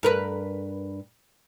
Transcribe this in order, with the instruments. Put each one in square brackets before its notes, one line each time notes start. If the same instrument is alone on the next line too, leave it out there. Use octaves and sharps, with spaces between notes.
[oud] G2 A#4 B4